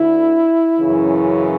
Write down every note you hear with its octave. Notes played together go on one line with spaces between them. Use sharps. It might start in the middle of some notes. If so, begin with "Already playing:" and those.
Already playing: D2 D3 E4
F#2 C#3 E3